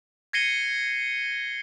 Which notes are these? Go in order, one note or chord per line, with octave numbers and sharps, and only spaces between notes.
G#6 A#6 C7 C#7 D#7 G7